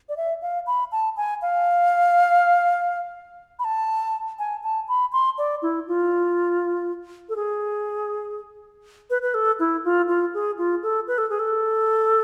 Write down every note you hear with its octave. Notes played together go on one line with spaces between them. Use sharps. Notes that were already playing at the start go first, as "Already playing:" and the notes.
D5
E5
F5
B5
A5
G#5
F5
B5
A5
G#5
A5
B5
C6
D5
E4
F4
A4
G#4
B4
B4
A4
E4
F4
F4
G#4
F4
A4
B4
A4
G#4
A4